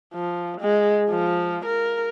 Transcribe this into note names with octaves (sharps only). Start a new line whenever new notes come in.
F3
G#3
F3
A#4